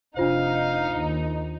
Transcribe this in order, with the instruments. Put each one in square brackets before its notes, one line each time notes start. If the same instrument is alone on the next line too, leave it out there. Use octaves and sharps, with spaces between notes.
[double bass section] F1 [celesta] D4 F4 C5 [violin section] D#4 [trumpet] F5
[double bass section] D#2